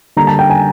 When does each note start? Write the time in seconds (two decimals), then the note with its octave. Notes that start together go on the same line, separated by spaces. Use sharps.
0.16 D3 G3 A#3 A#5
0.27 A5
0.39 G5
0.50 G#5